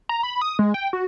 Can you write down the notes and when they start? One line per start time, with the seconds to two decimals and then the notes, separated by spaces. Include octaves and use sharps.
0.09 A#5
0.23 B5
0.41 D#6
0.59 G#3
0.74 G5
0.93 F#4